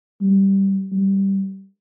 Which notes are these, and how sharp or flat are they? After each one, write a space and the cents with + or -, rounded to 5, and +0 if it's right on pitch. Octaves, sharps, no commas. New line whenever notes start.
G3 -5
G3 -10